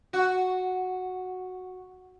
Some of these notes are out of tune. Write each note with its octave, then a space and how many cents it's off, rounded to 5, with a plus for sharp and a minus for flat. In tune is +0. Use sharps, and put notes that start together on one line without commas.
F#4 -5